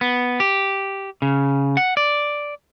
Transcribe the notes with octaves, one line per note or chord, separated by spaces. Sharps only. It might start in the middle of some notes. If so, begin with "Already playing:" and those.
B3
G4
C#3
F#5
D5